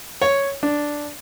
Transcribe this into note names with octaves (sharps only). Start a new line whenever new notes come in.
C#5
D4